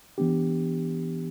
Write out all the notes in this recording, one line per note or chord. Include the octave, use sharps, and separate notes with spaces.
E3 B3 D4 G4